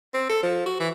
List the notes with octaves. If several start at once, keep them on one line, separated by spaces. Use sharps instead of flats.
C4
A4
F3
F#4
E3